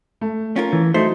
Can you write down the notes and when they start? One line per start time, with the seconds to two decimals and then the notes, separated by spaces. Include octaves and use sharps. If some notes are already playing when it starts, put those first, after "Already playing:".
0.21 A3
0.56 C#4 F4 A#4
0.73 E3
0.94 F#3 A3 D#4 C5